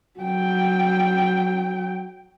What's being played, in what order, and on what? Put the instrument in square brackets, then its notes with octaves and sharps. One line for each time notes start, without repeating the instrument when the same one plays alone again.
[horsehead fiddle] F#3 G5